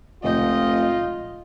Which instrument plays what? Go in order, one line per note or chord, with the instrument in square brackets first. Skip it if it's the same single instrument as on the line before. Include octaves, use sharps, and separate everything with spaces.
[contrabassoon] F1 [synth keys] C#2 A#2 G6 [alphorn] F4 [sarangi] D#5